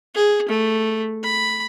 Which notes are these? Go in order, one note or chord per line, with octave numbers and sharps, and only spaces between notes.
G#4
A3
B5